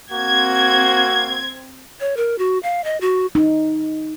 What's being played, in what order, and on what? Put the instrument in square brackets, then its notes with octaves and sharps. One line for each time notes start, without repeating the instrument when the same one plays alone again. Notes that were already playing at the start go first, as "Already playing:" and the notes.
[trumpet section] A#3 F#4 [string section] C4 G#6
[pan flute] C#5
A#4
F#4
F5
D#5
F#4
[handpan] D#4